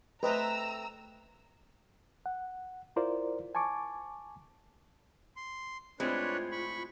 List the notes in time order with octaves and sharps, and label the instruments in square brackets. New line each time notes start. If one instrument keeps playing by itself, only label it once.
[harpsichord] A3 C4 G5 [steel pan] B4 C5 D#5 [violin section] A#5 E6
[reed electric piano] F#5
E4 F4 A#4 C5 D5
G#5 A5 C#6 D6
[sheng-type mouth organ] C6
[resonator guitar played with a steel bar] A2 G#3 C4 [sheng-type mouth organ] D4 B4 C#5 [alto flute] F4
[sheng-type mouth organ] B5 C#6